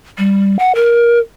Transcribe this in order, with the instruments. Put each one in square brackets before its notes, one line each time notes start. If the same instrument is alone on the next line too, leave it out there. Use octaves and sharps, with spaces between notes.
[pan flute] G3
F#5
A#4